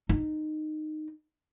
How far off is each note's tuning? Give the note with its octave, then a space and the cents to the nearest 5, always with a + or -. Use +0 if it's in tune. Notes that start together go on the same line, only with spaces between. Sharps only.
D#4 -15